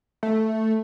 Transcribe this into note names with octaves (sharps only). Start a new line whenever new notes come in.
A3